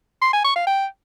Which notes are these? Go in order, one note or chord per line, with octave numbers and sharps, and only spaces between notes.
C6
G#5
C#6
F5
G5